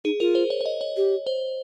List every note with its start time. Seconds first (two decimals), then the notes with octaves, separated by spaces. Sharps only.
0.04 D#4 G#4
0.20 F4 A#4
0.35 C5
0.50 C#5
0.61 C#5
0.66 D#5
0.81 C#5
0.96 G4
1.27 C5